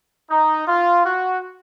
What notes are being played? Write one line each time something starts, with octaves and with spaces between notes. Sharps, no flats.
D#4
F4
F#4